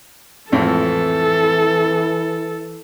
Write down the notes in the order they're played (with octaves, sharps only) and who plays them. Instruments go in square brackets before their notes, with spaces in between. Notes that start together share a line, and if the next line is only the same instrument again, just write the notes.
[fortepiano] G#1 F2 A2 [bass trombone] E3 [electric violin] A4